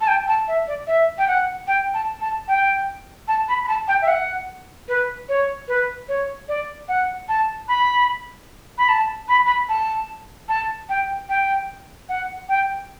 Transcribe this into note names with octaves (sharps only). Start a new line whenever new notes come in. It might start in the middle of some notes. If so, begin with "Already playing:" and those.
A5
G5
A5
E5
D5
E5
G5
F#5
G5
A5
A5
G5
A5
B5
B5
A5
G5
E5
F#5
B4
C#5
B4
C#5
D5
F#5
A5
B5
B5
A5
B5
B5
A5
A5
G5
G5
F#5
G5